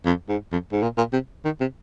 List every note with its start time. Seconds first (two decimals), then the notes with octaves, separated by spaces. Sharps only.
0.05 F2
0.28 G#2
0.52 F2
0.72 G#2
0.82 A#2
0.97 A#2
1.13 C3
1.45 D#3
1.60 C3